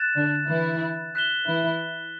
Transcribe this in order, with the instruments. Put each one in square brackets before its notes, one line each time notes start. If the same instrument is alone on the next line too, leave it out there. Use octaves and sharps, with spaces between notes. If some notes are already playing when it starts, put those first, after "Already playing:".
Already playing: [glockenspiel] F#6 A6 E7
[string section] D3 D4
E3 E4
[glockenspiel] F#6 B6 E7 G7
[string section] E3 E4